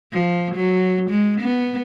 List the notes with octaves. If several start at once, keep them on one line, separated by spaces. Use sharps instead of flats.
F3
F#3
G#3
B3